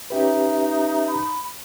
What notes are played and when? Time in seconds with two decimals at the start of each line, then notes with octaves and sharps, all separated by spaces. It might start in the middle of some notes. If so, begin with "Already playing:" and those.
0.10 C#4 D#4 G4 B4 E5
1.07 B5